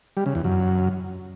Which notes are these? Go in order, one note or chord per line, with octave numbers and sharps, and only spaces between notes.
G3
C#3
E2
F#2